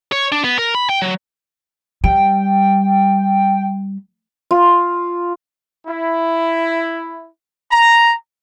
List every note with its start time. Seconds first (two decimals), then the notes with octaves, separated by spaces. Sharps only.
0.12 C#5
0.32 D4
0.44 B3
0.59 A#4
0.75 B5
0.89 G5
1.02 F#3
2.04 G3 G5
4.51 F4
5.87 E4
7.72 A#5